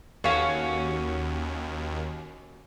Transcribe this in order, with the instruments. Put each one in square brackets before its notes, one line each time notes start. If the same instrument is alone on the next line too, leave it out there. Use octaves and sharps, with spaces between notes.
[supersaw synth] D#2 [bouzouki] C#4 F#4 [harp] A4 C#5 F5